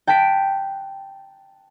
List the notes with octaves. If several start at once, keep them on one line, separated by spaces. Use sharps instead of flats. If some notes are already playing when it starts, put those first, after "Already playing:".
G5 A5 F#6 B6 D7